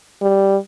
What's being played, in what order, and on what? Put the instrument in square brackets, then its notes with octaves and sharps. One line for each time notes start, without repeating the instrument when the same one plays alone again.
[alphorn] G3